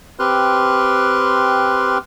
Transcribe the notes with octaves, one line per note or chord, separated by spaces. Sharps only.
C4 G4 B4 C6 F6 F#6